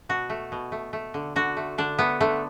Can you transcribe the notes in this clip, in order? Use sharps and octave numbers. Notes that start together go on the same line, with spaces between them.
B2 F#4
A3
B2
A3
A3
D3
D3 F#4
A3
D3 D4
A3 B3
D3 A3